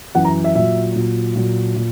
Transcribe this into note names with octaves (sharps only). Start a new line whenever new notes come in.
F#2 E3 F#5
A#5
E5
A#2 F#3 E5
A#2 F#3
A#2 F#3
A#2